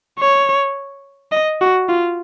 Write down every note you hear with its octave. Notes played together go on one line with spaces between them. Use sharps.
C#5
D#5
F#4
F4